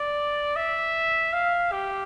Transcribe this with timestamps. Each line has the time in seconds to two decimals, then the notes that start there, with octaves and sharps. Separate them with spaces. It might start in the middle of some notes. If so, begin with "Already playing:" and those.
Already playing: D5
0.56 E5
1.33 F5
1.72 G4